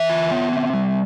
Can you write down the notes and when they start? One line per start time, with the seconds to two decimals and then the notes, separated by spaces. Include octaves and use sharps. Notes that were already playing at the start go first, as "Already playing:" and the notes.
Already playing: E3 E5
0.09 F4
0.31 B3
0.53 C4
0.74 G3